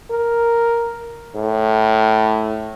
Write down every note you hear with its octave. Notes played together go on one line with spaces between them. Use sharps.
A#4
A2